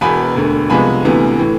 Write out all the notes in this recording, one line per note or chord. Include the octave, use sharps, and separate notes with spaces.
E1 E2 B2 B3 G#5 B5
E1 D2 D3
C2 C3 F3 G#3 B3 G#5 B5
D2 C3 E3 B3
A2 E3